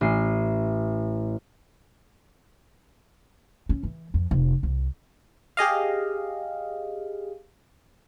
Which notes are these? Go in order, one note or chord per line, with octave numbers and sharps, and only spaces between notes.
A1 C7
C#4
E3
F2
F1
C2
G4 G#4 D#5 F5